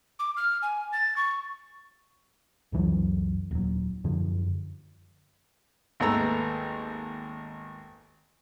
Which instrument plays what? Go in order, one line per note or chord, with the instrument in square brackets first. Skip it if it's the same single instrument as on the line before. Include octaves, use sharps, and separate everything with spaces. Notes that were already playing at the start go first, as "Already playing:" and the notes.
[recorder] D6
F6
G#5
A6
C#6
[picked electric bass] C#2 F#2 E3 F#3
D#1 F#3
F#2 D3 F3
[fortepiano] G#1 D#2 A3 B3 A#5 E6